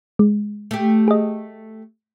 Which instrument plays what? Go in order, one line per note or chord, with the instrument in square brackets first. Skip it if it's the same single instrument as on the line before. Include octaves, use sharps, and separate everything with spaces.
[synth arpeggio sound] G#3
[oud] A3 G4
[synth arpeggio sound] G#4 D#5